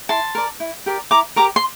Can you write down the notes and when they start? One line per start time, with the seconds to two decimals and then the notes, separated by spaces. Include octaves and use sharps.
0.09 E4 A5 C6
0.35 A#4 D5
0.60 E4
0.86 G4 A#4 D5
1.11 E4 A#5 D6
1.36 G4 A#4 A#5 D6
1.56 C6